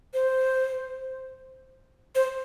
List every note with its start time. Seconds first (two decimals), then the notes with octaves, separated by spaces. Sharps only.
0.14 C5
2.15 C5